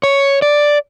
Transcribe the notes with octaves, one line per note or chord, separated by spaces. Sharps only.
C#5
D5